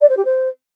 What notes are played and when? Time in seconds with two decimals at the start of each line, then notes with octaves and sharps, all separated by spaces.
0.01 D5
0.09 C5
0.17 G4
0.25 C5